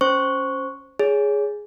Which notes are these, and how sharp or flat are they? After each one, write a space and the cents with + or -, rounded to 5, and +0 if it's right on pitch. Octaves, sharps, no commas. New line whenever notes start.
C#4 +0 C5 +0 C#6 +0
G#4 +0 C#5 +25